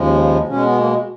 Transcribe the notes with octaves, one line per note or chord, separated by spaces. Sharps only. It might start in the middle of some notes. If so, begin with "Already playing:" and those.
Already playing: D#2 C#3 F3 G#3
B2 G#3 C#4
B3
A#3